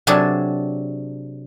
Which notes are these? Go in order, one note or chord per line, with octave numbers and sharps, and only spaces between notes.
C3 F#3 D4 G#4 A4